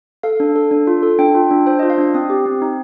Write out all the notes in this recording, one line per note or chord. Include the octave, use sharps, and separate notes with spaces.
A4 F5
D4
A4
D4
F4
A4
D4 G5
F4
D4
D4 C5
F4 D#5
F5
D4
C4 D#6
G4
C4
D#4